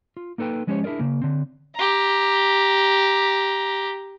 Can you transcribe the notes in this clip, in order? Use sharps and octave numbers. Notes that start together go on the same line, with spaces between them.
F4
A#3 D#4 A4 B4 G5
F3 G#3 C#4 G4 C5 C#5
D4 E4 G#4 A#4 D5
C#3 A#3
D3 C4
G4 A#5